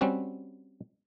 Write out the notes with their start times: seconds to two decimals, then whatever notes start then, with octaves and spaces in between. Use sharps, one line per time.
0.01 G3 C4 C#4 F#4